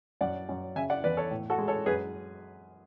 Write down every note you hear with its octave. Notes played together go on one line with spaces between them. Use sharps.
F#2 D5 F#5
F#2
C#3 E5 G#5
D5 F#5
E2 B4 D5
A4 C#5
A2
F#4 A4
G#3
A4 C#5
F#2 G#4 B4